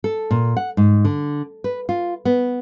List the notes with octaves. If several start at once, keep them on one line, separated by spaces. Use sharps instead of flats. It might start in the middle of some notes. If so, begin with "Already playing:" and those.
A4
A#2
F#5
G#2
D3
B4
F4
B3